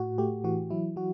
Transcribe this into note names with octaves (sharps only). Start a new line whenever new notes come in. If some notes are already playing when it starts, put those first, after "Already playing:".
Already playing: A2 A3 F#4
A3 G4
E3 F#4
F#3 E4
F#3 F#4